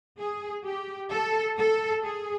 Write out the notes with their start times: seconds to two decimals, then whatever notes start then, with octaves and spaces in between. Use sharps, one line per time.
0.18 G#4
0.65 G4
1.11 A4
1.58 A4
2.03 G#4